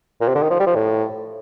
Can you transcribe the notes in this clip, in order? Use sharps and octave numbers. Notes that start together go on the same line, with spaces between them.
A#2
C3
D3
D#3
F3
G3
F3
A2